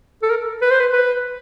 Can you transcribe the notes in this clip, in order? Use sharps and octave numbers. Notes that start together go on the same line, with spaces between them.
A4
A#4
B4
C5
B4
B4